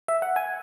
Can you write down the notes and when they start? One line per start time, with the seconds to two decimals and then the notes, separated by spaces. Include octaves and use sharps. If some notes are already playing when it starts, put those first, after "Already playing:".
0.08 E5
0.22 F#5
0.36 G#5